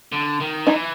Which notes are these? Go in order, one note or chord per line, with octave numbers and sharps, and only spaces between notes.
D3
D#3
E3 D#4